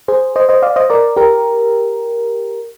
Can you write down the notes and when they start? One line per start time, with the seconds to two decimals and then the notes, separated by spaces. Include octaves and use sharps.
0.08 G#4 C5
0.36 C5 D#5
0.49 C5 D#5
0.62 D5 F5
0.76 C5 D#5
0.90 A#4 D5
1.16 G4 A#4